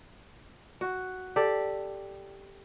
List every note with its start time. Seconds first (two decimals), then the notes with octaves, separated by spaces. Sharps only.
0.81 F#4
1.36 G4 A4 D5